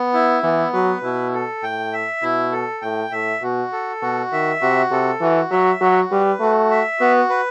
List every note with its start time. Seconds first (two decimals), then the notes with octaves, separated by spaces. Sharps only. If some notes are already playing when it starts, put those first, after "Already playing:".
Already playing: B3
0.14 E4
0.43 E3 B3
0.73 F#3 B4
1.03 B2 E4
1.34 A4
1.63 A2 G5
1.93 E5
2.22 B2 E4
2.52 A4
2.82 A2 G5
3.12 A2 E5
3.42 B2 F#4
3.72 A4
4.02 B2 F#4
4.32 D#3 E5
4.61 C3 F#4
4.91 C3 A4
5.21 E3 F#4
5.50 F#3 E5
5.80 F#3 F#4
6.10 G3 B4
6.40 A3 F#4
6.71 E5
7.00 B3 F#4
7.30 B4